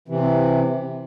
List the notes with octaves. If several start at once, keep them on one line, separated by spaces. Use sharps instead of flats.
C3 E3